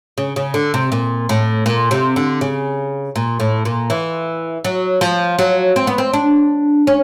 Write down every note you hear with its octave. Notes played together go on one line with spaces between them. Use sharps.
C#3
C#3
D3
C3
A#2
A2
A#2
C3
D3
C#3
A#2
A2
A#2
E3
F#3
F3
F#3
C4
B3
C4
D4
C#4